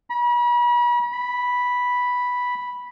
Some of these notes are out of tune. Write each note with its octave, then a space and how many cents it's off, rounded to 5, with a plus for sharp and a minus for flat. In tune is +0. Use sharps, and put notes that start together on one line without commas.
B5 -40
B5 -5